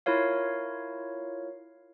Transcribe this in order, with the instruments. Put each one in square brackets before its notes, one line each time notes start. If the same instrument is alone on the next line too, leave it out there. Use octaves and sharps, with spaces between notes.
[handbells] E4 F4 A#4 C#5 F5